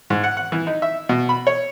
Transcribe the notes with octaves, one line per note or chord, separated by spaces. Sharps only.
G#2
F#5
F#5
E3
D#4
E5
B2
B5
C#5